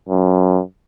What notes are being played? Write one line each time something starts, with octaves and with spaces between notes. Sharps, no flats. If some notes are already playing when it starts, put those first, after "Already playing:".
F#2